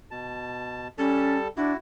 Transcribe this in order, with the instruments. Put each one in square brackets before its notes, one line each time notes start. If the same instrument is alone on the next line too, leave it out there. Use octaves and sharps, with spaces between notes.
[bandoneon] B2 A5
[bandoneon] G3 A4 A5 [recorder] C#4
[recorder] D4 [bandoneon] E4 F#4